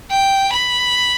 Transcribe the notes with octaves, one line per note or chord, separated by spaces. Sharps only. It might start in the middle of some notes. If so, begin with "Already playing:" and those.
G5
B5